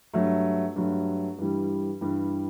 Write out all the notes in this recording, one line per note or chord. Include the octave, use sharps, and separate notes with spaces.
G2 F#3 A3
G2 F#3 A3
G2 E3 G3
G2 E3 G3